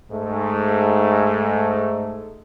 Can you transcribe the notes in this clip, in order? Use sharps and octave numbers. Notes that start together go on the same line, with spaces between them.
G#2 A3